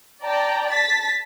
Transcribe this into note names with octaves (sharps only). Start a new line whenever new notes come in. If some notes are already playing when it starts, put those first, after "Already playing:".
D5 G5 A5 A#5
A5 A6 B6